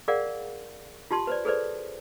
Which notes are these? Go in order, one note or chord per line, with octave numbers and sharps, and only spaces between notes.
G#4 A#4 D5 F5 F#5
F4 G4 A5 C6
B4 C5 D5
G#4 A4 B4 C5 D5